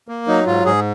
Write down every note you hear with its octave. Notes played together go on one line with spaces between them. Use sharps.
A#3
F#3 D#4
G#2 F4
G#2 G#4